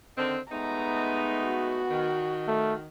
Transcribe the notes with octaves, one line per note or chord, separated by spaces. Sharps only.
D3 D#3 C4
G#3 A3 B3 D#4 A#5
F#4
D#3
A3